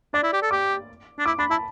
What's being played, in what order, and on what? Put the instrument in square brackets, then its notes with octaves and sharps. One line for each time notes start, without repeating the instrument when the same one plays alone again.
[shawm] D4 [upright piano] D5
[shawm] E4
G4
A4
[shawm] G4 [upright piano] D6
[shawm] D4
[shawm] E4 [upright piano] D6
[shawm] D4 [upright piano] B5
[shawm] E4 [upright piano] A5